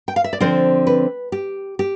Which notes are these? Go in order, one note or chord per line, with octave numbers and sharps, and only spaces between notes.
G5
F5
E5
D5
D3 F3 C4 C5
B4
G4
G4